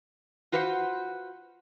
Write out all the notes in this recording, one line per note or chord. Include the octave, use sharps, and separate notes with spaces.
F4 F#4 B4 C5 E5 F#5